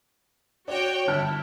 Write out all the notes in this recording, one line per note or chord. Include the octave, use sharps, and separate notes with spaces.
F#4 C#5 D5 G5
G1 E4 A5 F6